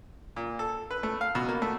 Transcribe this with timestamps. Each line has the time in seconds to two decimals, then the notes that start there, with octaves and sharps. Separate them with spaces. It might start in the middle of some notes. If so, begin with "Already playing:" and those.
0.36 A#2
0.59 A4
0.91 B4
1.03 A3
1.21 F5
1.35 B2
1.49 A#3
1.62 A3